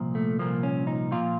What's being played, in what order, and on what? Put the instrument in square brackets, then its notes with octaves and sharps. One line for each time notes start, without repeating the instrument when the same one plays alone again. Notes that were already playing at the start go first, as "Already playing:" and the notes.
Already playing: [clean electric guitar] C2 A#2 F3
A3
C2 A#2 F3 A#3
C#4
D#4
A#2 F3 F4